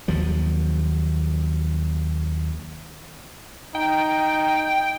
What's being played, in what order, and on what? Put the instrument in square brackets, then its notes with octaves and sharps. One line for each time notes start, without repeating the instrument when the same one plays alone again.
[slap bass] D#2 F3 F#3
[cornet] D#4 [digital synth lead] G5